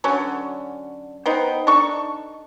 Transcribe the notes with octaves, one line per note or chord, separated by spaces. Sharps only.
D3 F#3 C#4
B3 D#4 C5 G5
D4 D#4 A4 C#6